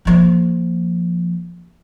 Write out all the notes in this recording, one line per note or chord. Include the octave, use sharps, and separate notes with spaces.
F3 A#3